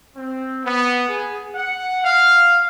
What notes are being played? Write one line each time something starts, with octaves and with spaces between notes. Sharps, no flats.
C4
B3
G#4
F#5
F5